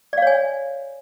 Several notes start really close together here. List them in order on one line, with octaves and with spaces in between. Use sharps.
D5 F5 C#5 G#5